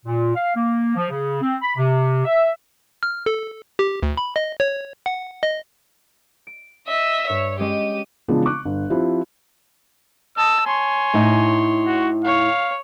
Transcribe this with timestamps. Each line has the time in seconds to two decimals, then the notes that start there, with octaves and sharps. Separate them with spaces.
0.06 A#2
0.35 F5
0.55 A#3
0.96 F3
1.10 C#3
1.41 C4
1.62 B5
1.77 C3
2.25 E5
3.03 F6
3.26 A4
3.79 G4
4.03 D2
4.17 B5
4.36 D#5
4.60 C#5
5.06 F#5
5.43 D#5
6.47 D7
6.87 D#5 E5
7.30 G2 C#5
7.60 G#3 C#4 G4 D#7
8.28 C#3 E3 F3 G#3 B3 D4
8.45 C#6 D6 F#6
8.65 G1
8.90 F3 C4 E4 G4
10.37 D#5 A5 E6
10.67 C#5 G#5 C6
11.14 A2 D#4
11.87 F#4
12.25 C#5 F5